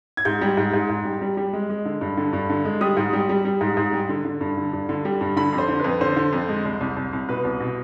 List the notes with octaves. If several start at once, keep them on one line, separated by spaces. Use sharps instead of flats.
G#6
G#2 G6
G3
G#2
G#2
G#2
G3
G3
G3
G#3
G#3
D3
G2
D3
G2
D3
G#3
G3 D#6
G#2
G3
G3
G3
G#2
G#2
G3
D3
D3
G2
D3
G2
D3
G3
G2
D3 B5
F2
C5
D3
F2 B4
D3 C5
D3
F2
G#3
C2
C2
C2
C2
B2 B4
C2
B2